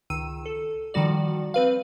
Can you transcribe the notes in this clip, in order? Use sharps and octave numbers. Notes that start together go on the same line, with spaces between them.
C#2 D#3 E6 D#7
A4
D#3 F3 G3 F#4 D5
C4 B4 F5